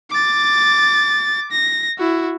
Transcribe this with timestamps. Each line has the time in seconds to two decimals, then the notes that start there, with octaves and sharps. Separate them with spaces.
0.11 D6 A6
1.51 A#6
1.99 E4 F#4